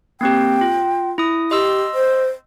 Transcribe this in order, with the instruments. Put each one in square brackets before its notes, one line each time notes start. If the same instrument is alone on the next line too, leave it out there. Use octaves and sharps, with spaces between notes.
[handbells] A#3 C4 G4 [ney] G5
[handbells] F4
E4 D#6
[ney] G4 [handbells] D#5 C6 E6
[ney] C5